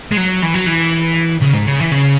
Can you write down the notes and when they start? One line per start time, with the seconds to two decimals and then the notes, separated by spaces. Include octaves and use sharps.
0.11 G#3
0.17 F#3
0.42 E3
0.54 F#3
0.66 E3
1.42 C#3
1.54 G#2
1.67 C#3
1.80 E3
1.92 C#3